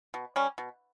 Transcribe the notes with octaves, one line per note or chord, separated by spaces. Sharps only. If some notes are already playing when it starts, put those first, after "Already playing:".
B2
G3 C#4
B2